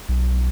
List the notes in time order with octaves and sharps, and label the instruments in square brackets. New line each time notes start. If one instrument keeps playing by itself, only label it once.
[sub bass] B1